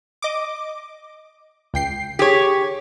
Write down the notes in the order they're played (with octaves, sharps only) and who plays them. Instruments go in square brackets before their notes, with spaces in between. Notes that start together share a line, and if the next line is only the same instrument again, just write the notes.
[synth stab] D#5 D6
C#2 G5 C7
[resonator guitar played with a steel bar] G4 C#5 [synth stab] G#4